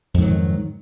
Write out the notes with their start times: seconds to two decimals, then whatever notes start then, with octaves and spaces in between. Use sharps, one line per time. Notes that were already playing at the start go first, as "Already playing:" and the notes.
0.14 F2
0.18 G#2
0.22 F#3
0.25 D#3